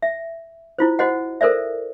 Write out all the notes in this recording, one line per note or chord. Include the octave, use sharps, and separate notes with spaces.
E5
E4 F4 C5
F#4 C5 D#5 F#5
A4 A#4 C5 D5 E5